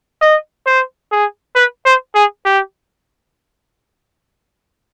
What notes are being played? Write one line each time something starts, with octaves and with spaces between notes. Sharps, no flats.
D#5
C5
G#4
B4
C5
G#4
G4